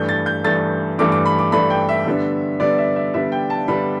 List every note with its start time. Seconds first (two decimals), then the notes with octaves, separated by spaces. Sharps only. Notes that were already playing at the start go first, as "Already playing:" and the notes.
Already playing: G2 E3 A3 D4 G6
0.09 A6
0.26 G6
0.44 G2 E3 A3 D4 A6
0.98 G2 E3 A3 D4 D6
1.12 D6
1.25 B5
1.39 D6
1.52 G2 E3 A3 D4 B5
1.70 G5
1.89 E5
2.06 D3 G3 B3 D4
2.60 D3 G3 B3 D4 D5
2.78 E5
2.96 E5
3.14 D3 G3 B3 D4 E5
3.32 G5
3.50 A5
3.68 D3 G3 B3 D4 B5